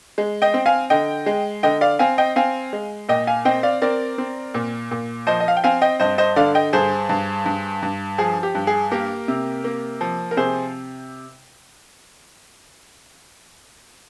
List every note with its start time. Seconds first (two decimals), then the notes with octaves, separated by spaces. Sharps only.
0.18 G#3
0.42 D#5 G5
0.54 C4
0.66 F5 G#5
0.90 D3 D#5 G5
1.26 G#3
1.63 D3 D#5 G5
1.81 D5 F5
1.99 C4 F5 G#5
2.18 D#5 G5
2.36 C4 F5 G#5
2.73 G#3
3.09 A#2 D#5 G5
3.27 F5 G#5
3.45 C4 D#5 G5
3.63 D5 F5
3.82 C4 A#4 D5
4.18 C4
4.54 A#2
4.91 A#2
5.27 F3 C5 D#5
5.40 D#5
5.48 F5
5.57 G5
5.64 C4 F5 G#5
5.82 D#5 G5
6.00 G2 C5 D#5
6.18 C5 D#5
6.36 D3 D5 F5
6.55 D#5 G5
6.73 G2 G#4 C5
7.09 G2
7.46 G2
7.83 G2
8.18 F3 G#4
8.43 G4
8.55 G2
8.67 G#4
8.91 A#3 G4 A#4
9.28 C3
9.64 A#3
10.01 F3
10.31 A#4
10.37 C3 G#4 C5